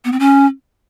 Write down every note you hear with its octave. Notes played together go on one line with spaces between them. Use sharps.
B3
C4
C#4